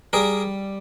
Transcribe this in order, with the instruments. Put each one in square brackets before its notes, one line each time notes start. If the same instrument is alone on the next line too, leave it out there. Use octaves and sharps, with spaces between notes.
[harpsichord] G3 G#4 A#4